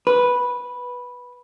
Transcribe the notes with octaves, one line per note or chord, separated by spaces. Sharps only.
B4